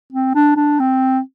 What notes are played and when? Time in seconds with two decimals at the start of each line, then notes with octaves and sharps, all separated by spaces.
0.13 C4
0.35 D4
0.56 D4
0.79 C4